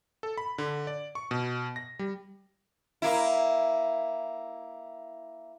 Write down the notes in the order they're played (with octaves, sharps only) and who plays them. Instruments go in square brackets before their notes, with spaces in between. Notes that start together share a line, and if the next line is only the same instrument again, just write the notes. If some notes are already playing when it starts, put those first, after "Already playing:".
[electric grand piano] A4
B5
D3
D5
C#6
B2
A#6
G3
[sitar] A#3 E4